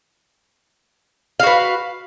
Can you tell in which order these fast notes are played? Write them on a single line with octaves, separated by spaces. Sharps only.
F5 F#4 B4